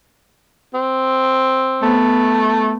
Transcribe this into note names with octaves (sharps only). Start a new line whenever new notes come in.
C4
A3 B3